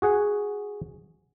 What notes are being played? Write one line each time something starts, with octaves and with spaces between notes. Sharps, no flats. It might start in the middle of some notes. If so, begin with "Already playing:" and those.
F#4 G#4 F#5